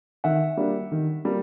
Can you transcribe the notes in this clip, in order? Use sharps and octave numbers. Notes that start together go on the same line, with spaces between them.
D#3 E5 F#5
G3 A#3 D4
D#3
G3 A#3